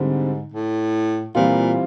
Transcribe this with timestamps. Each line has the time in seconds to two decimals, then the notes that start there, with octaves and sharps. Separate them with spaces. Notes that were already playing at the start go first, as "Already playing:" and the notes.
Already playing: G#2 D3 G3 C4
0.53 A2
1.35 A#2 E3 G3 C4 F4